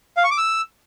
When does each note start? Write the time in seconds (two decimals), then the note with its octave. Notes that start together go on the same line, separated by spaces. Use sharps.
0.17 F5
0.24 C#6
0.31 D6
0.38 E6